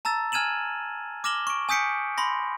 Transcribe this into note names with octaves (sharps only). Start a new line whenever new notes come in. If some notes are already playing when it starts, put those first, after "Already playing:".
A5 A#5 E6 A6
G#5 F6 G#6 D#7 E7 F#7
D6 F6 A#6 E7 F#7 G7
C#6 D7
G#5 D#6 G6 B6 C#7 D7
B5 C6 A#6